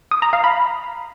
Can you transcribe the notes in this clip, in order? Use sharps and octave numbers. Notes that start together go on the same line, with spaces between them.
D#6
A#5
F5
B5